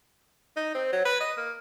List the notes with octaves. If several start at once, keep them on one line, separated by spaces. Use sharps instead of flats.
D#4
C4
F#3
B4
D#5
A#3